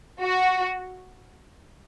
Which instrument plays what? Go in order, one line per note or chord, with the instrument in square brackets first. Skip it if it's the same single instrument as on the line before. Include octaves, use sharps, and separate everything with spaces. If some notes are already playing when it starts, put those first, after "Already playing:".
[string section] F#4